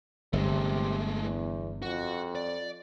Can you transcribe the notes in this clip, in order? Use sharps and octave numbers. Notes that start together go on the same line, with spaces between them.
G1 C3 G#3 A3
E2
F2 F#4
D5